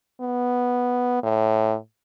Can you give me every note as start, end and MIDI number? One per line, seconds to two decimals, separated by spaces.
0.21 1.22 59
1.23 1.76 45